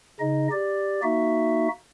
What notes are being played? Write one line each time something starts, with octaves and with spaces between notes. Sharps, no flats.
C#3 D#4 D#5
G4 D5
A#3 D#4 F#4 E5